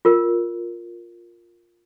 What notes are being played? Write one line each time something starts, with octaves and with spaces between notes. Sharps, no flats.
F4 A#4